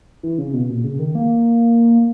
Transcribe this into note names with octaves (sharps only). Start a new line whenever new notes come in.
E3
C#3
B2
A#2
C#3
D#3
A#3